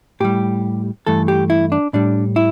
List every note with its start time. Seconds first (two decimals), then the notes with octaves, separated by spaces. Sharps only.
0.20 A2 G3 G4
1.07 G2 E3 A3 A4
1.28 G4
1.50 E4
1.72 D4
1.93 A2 G3 D4
2.36 E4